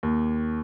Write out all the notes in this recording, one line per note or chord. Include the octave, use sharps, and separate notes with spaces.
D#2